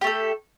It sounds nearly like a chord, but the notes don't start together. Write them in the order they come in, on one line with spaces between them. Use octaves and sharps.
G4 A3 A4